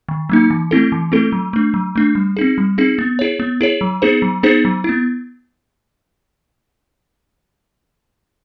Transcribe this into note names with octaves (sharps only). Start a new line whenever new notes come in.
D#3
F#3 A#3 D#4
E3
A3 C4 E4 A4
E3
A3 C4 E4 A4
F#3
A3 D4
F#3
A3 D4
G3
C4 D#4 G#4
G3
C4 D#4 G#4
B3
E4 G#4 C#5
B3
E4 G#4 C#5
F#3
B3 D#4 G#4 C5
F#3
B3 D#4 G#4 C5
F#3
B3 E4